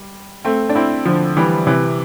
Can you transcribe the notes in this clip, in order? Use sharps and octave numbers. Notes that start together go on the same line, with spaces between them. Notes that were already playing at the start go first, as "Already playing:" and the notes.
Already playing: G3
A3 C4
D4
C4 E4
D3 F3
E3 G3
C3 E3